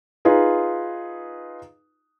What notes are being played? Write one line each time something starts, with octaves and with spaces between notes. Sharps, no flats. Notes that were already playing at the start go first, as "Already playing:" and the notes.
D#4 F4 G#4 B4